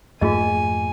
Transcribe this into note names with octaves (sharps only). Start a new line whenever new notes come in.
F2 G#2 A3 A#3 F4 G#4 D#5 G#5